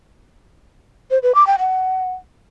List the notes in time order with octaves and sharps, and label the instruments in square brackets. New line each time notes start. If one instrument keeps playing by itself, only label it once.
[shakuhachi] C5
B4
D6
G5
F#5